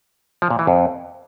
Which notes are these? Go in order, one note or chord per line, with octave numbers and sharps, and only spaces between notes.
F3
A#2
E3
F2